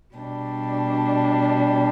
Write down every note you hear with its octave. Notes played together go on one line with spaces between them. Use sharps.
B2 G3 D4